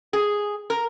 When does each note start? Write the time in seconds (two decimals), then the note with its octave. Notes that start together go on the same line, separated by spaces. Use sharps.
0.13 G#4
0.70 A#4